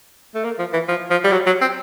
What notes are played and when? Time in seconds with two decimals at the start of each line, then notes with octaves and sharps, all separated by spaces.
0.35 A3
0.44 A#3
0.59 F3
0.73 E3
0.88 F3
1.10 F3
1.24 G3
1.32 F#3
1.46 F#3
1.61 C4